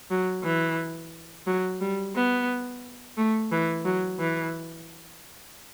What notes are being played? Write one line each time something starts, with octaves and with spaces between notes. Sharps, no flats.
F#3
E3
F#3
G3
B3
A3
E3
F#3
E3